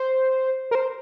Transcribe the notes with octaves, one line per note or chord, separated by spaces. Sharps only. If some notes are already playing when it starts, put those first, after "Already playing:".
Already playing: C5
A#4
C5